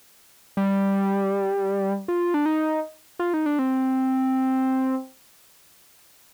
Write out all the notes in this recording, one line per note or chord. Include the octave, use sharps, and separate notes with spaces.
G3
F4
D4
D#4
F4
D#4
D4
C4